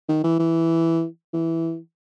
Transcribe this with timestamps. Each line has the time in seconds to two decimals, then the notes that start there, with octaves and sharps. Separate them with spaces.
0.09 D#3
0.24 E3
0.39 E3
1.33 E3